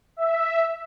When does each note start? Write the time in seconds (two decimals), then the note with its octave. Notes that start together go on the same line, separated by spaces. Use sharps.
0.17 E5